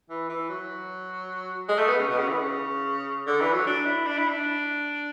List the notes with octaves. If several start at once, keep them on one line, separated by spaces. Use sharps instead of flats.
E3
E3
F#3
G#3
A3
B3
C#3
B2
C#3
E3
C#3
D3
E3
F#3
D4
E4
D4
E4
D4